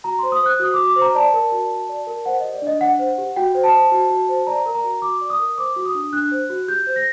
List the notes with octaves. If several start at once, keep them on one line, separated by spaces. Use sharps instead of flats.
F#4 A#5
C5 C6
D#6
C5 F#6
F#4 D#6
F#4 D6
D6
C5
A#5
D5 A5
A#4
F#4
F#4
D5
A#4
C5 F#5
G4 D#5
D5
D4 D#5
D4 F#5
C5
G4
F#4 G5
C5
A5
C5
F#4
F#4
C5
D5 A#5
A#4
A#5
F#4
F#4 D6
D5
D#6
A#4
C5 D6
F#4
D#6
D4
D4 F#6
C5
F#4
G4 G6
C5
A#6